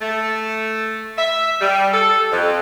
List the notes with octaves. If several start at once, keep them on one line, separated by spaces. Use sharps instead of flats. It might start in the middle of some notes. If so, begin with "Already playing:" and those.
A3
E5
G3
A4
F2